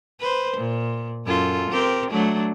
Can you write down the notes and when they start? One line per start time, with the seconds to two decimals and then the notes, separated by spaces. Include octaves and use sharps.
0.21 B4 C5
0.57 A#2
1.26 F#2 F4 A4
1.71 C4 G4 A#4
2.11 F#3 A3 D4